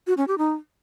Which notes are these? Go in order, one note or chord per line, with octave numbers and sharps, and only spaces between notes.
F#4
C#4
G4
D#4